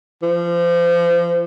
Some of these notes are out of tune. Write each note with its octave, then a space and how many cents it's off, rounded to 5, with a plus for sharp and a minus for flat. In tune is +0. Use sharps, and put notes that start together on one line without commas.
F3 -30